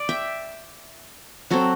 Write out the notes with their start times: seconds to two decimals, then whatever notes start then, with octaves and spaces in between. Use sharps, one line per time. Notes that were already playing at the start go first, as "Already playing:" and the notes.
Already playing: D5
0.09 E5 G5
1.50 F#3 C4 F#4 A4